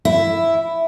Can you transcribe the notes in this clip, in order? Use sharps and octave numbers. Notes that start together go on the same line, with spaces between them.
E4